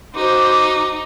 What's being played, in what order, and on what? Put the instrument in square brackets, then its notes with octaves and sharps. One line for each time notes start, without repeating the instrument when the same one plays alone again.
[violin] D#4 [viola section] F#4 C5 [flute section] D6